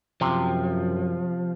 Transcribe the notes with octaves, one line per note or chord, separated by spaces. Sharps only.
F#2 C3 F3